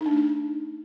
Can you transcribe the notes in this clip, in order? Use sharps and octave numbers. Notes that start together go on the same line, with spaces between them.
D#4
D4
A3
D#4